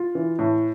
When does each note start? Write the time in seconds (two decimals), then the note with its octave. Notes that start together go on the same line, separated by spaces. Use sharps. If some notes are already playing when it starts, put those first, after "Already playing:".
Already playing: F4
0.15 E3
0.39 A2